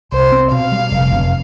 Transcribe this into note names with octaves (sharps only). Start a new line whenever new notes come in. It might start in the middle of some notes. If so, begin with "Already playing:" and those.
C2 C5
C4
B2 F5
G3
F1
F1